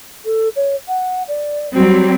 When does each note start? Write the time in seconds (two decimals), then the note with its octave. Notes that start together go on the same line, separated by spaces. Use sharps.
0.24 A4
0.55 C#5
0.87 F#5
1.28 D5
1.74 F#3 G3 C4 F#4